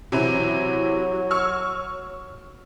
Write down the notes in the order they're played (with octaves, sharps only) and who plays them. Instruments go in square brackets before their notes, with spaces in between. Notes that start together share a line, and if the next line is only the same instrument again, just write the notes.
[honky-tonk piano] C3 E3 E4 [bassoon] F#3
[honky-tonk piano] C#6 E6 F6